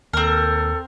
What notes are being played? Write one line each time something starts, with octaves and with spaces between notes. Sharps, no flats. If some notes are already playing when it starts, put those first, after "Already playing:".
D#2 C4 A4 A#4